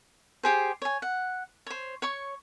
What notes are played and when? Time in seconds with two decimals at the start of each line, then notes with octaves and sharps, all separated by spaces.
0.43 G4 G#4 C5
0.82 C#5 G#5
1.02 F#5
1.66 C5 C#5
2.02 C#5 C#6